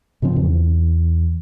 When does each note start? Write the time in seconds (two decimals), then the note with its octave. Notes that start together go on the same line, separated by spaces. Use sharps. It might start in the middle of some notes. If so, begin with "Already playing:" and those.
0.22 G#2 C#3 F3 C4
0.36 E2